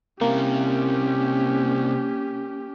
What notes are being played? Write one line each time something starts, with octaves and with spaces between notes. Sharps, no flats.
C3 A#3 C#4 E4 G4